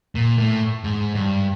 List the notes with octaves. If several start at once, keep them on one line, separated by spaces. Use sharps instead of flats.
A#2
A2
G#2
G2